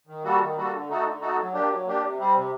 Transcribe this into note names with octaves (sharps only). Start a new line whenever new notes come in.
D#3
G3 A#3 F#4 A4
D#3
G3 A#3 F#4 A4
D3
A3 D#4 F#4 A4
D3
A3 D#4 F#4 A4
F#3
A#3 D4 G4
F#3
A#3 D4 G4
C3
G3 C4
C3